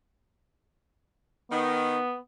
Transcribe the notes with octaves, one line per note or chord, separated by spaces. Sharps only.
D#3 B3